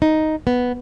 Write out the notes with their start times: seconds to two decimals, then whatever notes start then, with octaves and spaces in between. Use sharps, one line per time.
0.02 D#4
0.47 B3